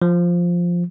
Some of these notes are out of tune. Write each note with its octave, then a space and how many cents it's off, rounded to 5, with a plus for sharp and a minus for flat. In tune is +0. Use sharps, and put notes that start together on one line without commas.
F3 +0